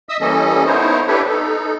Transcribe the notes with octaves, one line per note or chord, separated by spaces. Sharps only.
D#5 E5 D#6 E6
E3 G3 A#3 C#4 A4 D#5
B3 D#4 E4 C5 C#5
D4 E4 G4 A4 B4 C#5
D#4 A4